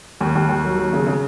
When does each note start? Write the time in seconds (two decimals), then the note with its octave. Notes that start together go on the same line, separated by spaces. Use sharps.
0.21 D#2
0.35 D#2
0.49 D#2
0.64 F#3
0.78 F#3
0.93 C#3
1.07 C#3